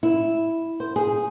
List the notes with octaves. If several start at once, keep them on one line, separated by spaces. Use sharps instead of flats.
E4
C5
G#4